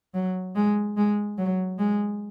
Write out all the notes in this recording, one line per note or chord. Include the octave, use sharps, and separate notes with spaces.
F#3
G#3
G#3
F#3
G#3